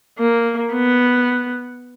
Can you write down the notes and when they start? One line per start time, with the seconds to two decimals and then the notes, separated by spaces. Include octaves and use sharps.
0.19 A#3
0.73 B3